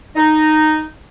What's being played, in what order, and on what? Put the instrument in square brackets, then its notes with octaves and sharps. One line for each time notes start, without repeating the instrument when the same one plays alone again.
[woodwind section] D#4